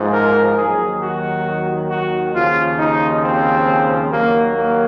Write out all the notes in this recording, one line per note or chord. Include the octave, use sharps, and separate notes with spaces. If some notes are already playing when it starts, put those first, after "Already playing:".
Already playing: G#2 F3
A#4
D#2 D#3 F#3 G#4
F#4
F#4
D#2 C#3 F3 F4
D#4
C4
D#2 D#3 F#3 A#3
A#3